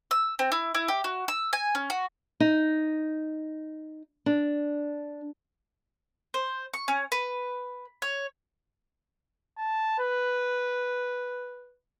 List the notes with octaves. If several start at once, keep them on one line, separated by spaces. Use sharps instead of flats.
E6
C4
E4
E4
G4
F#4
E6
G#5
C#4
F#4
D#4
D4
C5
C#6
C#4
B4
C#5
A5
B4